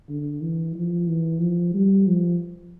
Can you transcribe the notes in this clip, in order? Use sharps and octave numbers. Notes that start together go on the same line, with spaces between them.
D3
E3
F3
E3
F3
G3
F3